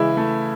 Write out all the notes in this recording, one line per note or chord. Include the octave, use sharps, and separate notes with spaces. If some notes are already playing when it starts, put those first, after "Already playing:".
Already playing: C#3 E3 G#3 E4
A3